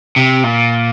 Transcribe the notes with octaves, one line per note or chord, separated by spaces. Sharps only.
C3
A#2